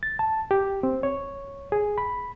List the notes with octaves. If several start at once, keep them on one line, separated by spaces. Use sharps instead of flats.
A6
A5
G4
C4
C#5
G#4
B5